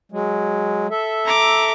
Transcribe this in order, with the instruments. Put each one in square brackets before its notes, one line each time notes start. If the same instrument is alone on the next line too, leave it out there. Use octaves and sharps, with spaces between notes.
[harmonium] F#3 G#3
A4 E5
[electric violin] A#5 D6